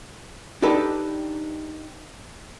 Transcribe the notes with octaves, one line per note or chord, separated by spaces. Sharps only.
D4 D#4 G4 A4 B4